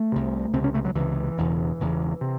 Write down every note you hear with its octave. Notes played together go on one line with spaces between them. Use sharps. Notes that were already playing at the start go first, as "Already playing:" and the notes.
Already playing: A3
C2 C3
C#2 C3 C4
C#4
A3
F#3
C#2 C3 E3
E1 E2 C#3
E1 E2 C#3
C3